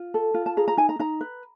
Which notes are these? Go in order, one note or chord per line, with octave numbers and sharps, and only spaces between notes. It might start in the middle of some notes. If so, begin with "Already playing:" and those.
Already playing: F4
A4
F4
A5
G#4 A#5
A#5
D#4 G#5
A#5
D#4 A#5
B4